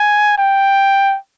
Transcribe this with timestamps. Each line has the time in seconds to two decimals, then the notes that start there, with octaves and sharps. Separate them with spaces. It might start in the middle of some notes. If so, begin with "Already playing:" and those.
Already playing: G#5
0.38 G5